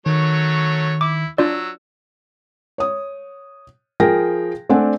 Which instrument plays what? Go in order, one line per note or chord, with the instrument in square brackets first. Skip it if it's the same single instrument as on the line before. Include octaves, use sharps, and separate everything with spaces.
[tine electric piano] D#3 [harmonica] F#3 A3 C#5
[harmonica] E4 [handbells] D6
[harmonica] F#3 E6 [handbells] D4 F4 D5
[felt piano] C#5 D#6
F3 G#4 A#4 G5 A#6
A3 C4 D4 D5 F#5 G#5